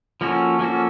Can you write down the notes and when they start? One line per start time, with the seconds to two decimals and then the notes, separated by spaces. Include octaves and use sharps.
0.21 F3 A#3 C#4 F#4 A4
0.59 F3 A#3 C#4 F#4 A4